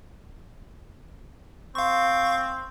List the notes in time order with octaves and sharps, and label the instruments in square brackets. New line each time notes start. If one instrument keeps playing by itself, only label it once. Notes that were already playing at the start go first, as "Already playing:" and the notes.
[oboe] C4 [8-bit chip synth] F5 C#6